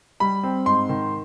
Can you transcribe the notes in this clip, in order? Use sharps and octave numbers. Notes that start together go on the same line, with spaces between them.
G3 B5
C4
G#2 C6
D#3